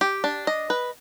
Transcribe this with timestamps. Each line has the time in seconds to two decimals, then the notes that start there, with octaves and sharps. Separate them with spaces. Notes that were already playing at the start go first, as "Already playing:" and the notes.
0.01 G4
0.24 D4
0.47 D#5
0.70 B4